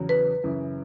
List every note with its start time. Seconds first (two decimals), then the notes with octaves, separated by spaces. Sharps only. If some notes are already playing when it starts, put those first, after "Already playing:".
Already playing: E2 C#3 F#3
0.09 B4
0.44 F#2 C#3 E3